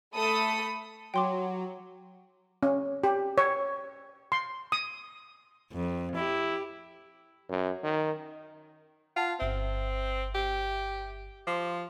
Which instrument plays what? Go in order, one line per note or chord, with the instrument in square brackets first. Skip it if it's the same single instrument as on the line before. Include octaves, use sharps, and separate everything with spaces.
[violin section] A3 A4 B5 D#6
[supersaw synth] F#3 [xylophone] G5 C6 D6
[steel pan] C#4
G4
C#5
C6
D#6
[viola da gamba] F2
[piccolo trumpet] E4 [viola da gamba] G4
[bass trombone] F#2
D#3
[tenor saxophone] F4 [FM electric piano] F#5 A5
[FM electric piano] G1 E5 [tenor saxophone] C4
[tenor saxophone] G4
[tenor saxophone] F3 [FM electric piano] C6 D6